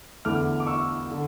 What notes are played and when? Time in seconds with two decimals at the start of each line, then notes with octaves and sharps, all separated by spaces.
0.25 E2 D3 A3 E4 D6 F6
0.60 D6
0.67 C#6 E6
1.11 D3